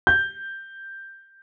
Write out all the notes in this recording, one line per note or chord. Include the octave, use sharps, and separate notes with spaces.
G6